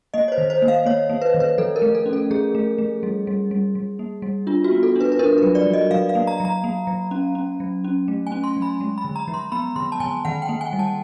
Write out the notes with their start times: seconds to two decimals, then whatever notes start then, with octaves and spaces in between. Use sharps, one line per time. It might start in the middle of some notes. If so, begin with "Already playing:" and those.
0.14 A#3 D#5
0.28 C#5
0.32 C5
0.38 D#3
0.50 C5
0.62 A#3
0.68 F5
0.85 A#3 C#5
1.09 A#3
1.21 B4
1.34 D#3
1.40 B4
1.58 F3 A4
1.76 A#4
1.82 A3
1.95 A4
2.06 C#4
2.13 A4
2.30 F3 G#4
2.55 A3
2.78 A3
3.03 G3
3.27 G3
3.51 G3
3.75 G3
3.99 A#3
4.22 G3
4.47 D4 F4
4.64 F#4
4.71 B3
4.83 A4
4.95 D4 B4
5.12 B4
5.19 D4 A#4
5.38 F#3 B4
5.55 D5
5.67 F#3
5.73 D#5
5.91 F#3 F5
6.09 F5
6.15 A#3
6.27 A#5
6.40 F#3 A#5
6.64 A#3
6.87 F#3
7.11 C#4
7.35 C#4
7.60 F#3
7.84 C#4
8.08 A3
8.27 G#5
8.32 C#4
8.44 C6
8.57 F#3
8.62 B5
8.81 G#3
8.98 B5
9.04 D3
9.16 A#5
9.28 F3
9.34 C6
9.52 B3 B5
9.76 D3 C6
9.92 A5
10.00 D3 G#5
10.25 D#3 F#5
10.42 G5
10.49 A#3
10.61 G#5
10.73 G3
10.79 A5